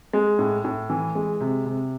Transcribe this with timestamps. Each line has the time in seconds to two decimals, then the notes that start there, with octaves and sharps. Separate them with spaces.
0.13 G#3
0.39 A2
0.65 A2
0.90 E3
1.15 G#3
1.40 C3
1.66 C3